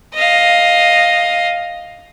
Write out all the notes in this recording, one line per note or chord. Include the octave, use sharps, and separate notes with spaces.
D#5 F5